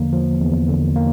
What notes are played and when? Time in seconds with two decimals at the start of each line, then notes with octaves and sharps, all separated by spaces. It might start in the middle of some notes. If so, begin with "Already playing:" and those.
Already playing: E2 D3 F3 A#3
0.13 F3
0.40 E2
0.68 D3
0.96 A#3